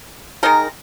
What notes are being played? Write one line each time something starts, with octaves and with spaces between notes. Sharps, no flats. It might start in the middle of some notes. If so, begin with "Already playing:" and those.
D#3 G#3 D#4 A#4